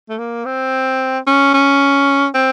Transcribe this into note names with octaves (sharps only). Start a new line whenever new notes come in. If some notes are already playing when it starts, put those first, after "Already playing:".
A3
A#3
C4
C#4
C#4
C4